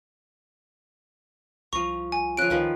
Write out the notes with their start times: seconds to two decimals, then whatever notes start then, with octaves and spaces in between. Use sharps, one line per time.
1.73 C2 F3 A#5 C#6
2.12 G#5
2.37 C#3 F3 F#6 D7
2.50 C#2 D#3 F3 B4